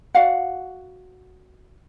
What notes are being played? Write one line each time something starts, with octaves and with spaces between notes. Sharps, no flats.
F#4 D5 F5 F#5